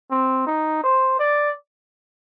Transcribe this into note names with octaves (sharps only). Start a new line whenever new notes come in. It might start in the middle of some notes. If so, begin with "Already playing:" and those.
C4
D#4
C5
D5